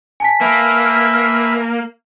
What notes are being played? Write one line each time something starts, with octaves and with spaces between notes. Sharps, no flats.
G#5 A5 B6
A#3 B4 E5